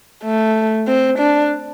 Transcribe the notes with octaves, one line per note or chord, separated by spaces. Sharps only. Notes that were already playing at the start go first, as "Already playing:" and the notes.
A3
C4
D4